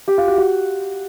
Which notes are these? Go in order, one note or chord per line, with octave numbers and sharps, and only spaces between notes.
G4
F4
F#4
F#4